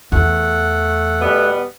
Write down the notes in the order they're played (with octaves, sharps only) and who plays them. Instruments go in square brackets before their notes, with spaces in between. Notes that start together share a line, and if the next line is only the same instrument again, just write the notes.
[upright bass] E2 [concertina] A3 F#5
[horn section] B2 G3 B3